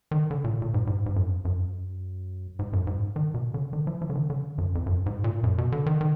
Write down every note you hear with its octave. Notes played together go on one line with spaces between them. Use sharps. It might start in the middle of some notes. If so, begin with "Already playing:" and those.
D#3
D3
A#2
A#2
G#2
G#2
G#2
F#2
F#2
G#2
F#2
G#2
D#3
B2
D3
D#3
F3
F3
D3
D#3
D3
F#2
F2
F#2
G#2
A#2
F#2
B2
D3
D#3
D#3